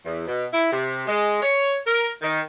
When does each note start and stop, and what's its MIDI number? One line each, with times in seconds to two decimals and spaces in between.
0.06 0.25 40
0.27 0.46 47
0.53 0.70 64
0.71 1.04 48
1.08 1.40 56
1.42 1.77 73
1.87 2.10 70
2.22 2.40 51